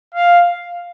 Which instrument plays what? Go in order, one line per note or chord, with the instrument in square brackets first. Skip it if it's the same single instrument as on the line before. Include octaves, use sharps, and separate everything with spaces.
[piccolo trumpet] F5